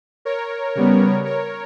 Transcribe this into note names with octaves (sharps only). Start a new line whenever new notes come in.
A#4 C#5
C#3 G3 B3
A#4 C#5